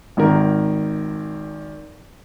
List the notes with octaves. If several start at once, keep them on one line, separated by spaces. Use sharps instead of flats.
G#1 D#3 A#4